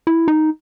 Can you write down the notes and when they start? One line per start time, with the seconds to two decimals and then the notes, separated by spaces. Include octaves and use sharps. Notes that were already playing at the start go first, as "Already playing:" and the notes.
0.07 E4
0.28 D#4